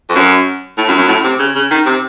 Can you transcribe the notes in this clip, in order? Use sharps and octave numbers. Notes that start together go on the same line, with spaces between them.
F2
F#2
A2
F#2
F#2
A2
C3
C#3
C#3
D#3
C3